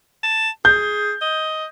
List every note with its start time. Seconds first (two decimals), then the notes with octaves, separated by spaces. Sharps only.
0.23 A5
0.65 G#4 G6
1.22 D#5